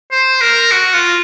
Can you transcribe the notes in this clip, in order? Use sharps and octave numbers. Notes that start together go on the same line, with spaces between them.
C5
A#4
F#4
F4